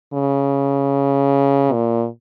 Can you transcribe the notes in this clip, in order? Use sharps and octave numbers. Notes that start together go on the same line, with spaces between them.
C#3
A#2